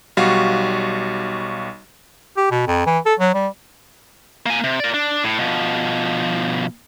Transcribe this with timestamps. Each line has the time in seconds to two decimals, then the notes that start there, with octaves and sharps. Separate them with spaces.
0.17 B1 G3 F#4 F5 C#6
2.37 G4
2.51 B2
2.67 F2
2.86 E3
3.06 A4
3.20 F#3
3.34 G3
4.46 A#3 G#5
4.64 C3
4.80 A#4 D5
4.94 D4
5.24 A2
5.39 B2 F3